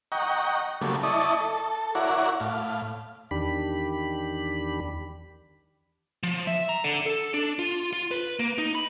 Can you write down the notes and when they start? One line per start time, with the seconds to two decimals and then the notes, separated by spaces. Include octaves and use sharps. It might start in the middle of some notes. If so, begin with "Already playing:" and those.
0.12 D#5 F#5 G5 A#5 C#6
0.81 C#3 F#3 G3 A3 A#3
1.03 E4 D5 D#5 A5 C#6 D#6
1.41 A4
1.95 E4 F#4 A#4 C#5 D5 F#5
2.40 A2 F5
3.31 E2 D#3 D4 G4 B5
6.23 F3
6.47 E5
6.69 A#5
6.84 D3
7.06 A4
7.34 D4
7.59 F4
7.93 F4
8.11 B4
8.39 A#3
8.58 D#4
8.75 B5